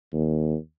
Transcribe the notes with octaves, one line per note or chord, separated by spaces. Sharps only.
D#2